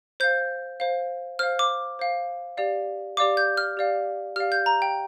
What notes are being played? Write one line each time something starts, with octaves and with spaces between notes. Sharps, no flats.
C5 F5 G6
C5 F5
C5 F5 F6
D6
C5 F5
G4 D5 F5
G4 D5 F5 D6
G6
F6
G4 D5 F5
G4 D5 F5 F6
G6
A#5
G5